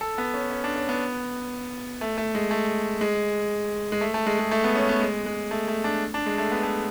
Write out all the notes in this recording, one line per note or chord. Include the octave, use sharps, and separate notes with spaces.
A4
B3
C#4
C#4
D4
C#4
B3
A3
A3
G#3
A3
G#3
G#3
A3
A3
G#3
G#3
A3
B3
C#4
B3
G#3
G#3
A3
A3
D4
D4
G#3
A3
B3
A3